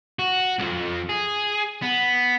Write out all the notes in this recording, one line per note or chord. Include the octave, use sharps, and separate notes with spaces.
F#4
B1 F2
G#4
B3